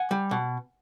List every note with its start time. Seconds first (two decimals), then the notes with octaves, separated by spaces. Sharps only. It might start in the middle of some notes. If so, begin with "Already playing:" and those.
Already playing: F#5 G#5
0.11 G3
0.31 B2